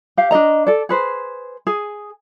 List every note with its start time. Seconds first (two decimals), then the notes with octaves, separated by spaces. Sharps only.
0.17 G4 F5
0.31 D4 G#4 D#5 A#5
0.67 A4 D5
0.89 G#4 B4 C5
1.67 G#4 G#5